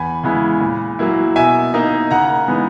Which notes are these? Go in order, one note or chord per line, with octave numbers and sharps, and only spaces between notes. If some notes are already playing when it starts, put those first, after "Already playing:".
Already playing: E2 G#5 B5
C#3 G#3 B3 E4
A#2
F#3 A#3 E4
B2 E5 G#5
A#3 D#4
C#3 F#5 A#5
E3 G#3 B3 D#4